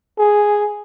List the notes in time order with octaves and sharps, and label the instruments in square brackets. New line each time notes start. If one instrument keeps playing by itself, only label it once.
[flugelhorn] G#4